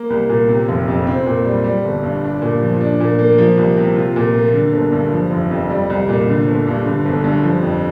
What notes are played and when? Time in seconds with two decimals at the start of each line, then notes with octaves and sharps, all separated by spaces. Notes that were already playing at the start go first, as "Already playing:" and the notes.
Already playing: A#3
0.10 C2
0.29 A#2
0.48 C3
0.69 F1
0.88 F2
1.07 C4
1.26 A#2
1.45 G3
1.64 G3
1.85 G1
2.03 G2
2.23 D4
2.42 A#2
2.62 F3
2.80 D4
3.00 A#2
3.19 A#3
3.38 F3
3.58 C2
3.77 C3
3.96 F4
4.16 A#2
4.34 A#3
4.54 D3
4.73 G1
4.92 G2
5.12 F3
5.31 F1
5.51 F2
5.70 G3
5.90 C2
6.09 A#2
6.28 D3
6.47 G1
6.67 G2
6.86 D3
7.05 G1
7.24 G2
7.43 F3
7.62 F2